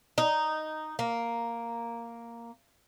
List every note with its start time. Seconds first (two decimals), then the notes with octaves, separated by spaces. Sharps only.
0.18 D#4
0.99 A#3